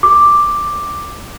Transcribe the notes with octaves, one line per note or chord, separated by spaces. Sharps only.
D6